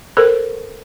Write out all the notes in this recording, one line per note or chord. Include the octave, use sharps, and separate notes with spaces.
A4 A#4 C5